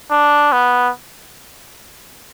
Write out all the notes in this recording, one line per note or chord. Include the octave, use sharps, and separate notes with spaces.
D4
B3